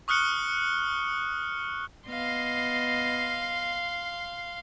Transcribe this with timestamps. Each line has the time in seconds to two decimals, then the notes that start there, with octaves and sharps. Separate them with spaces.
0.08 C#6 D#6 F6 F#6 C#7 G7
2.09 B3 D#5 F5 C6